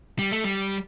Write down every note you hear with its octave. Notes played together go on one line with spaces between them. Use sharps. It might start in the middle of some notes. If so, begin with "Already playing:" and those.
G3
A3
G3